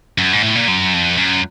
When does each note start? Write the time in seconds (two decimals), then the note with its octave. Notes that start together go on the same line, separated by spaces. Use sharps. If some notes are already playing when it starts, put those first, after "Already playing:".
0.18 F#2
0.33 G#2
0.43 A2
0.55 A#2
0.68 F#2
0.94 F2
1.18 F#2